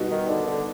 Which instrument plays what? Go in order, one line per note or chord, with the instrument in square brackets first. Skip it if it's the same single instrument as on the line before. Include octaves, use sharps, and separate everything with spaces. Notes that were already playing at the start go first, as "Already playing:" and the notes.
Already playing: [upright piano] B2 G3 B3 D#4 F#4
[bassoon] D#3
D3
D3